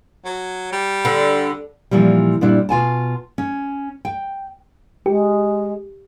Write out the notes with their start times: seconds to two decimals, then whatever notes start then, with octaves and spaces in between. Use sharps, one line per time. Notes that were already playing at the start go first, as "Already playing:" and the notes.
0.25 F#3
0.72 G3
1.05 D3
1.91 A#2 E3 F3 G3
2.41 A#2 G3 D4 E4
2.69 B2 F4 G#5 A5
3.38 C#4
4.05 G5
5.06 G#3 G4